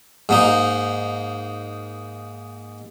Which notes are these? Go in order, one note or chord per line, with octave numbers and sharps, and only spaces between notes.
G#2 A#3 D#4